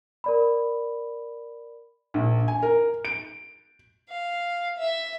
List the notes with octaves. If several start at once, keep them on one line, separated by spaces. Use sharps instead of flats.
A#4 D5 B5
A#1
G#5
A#4
D7
F5
E5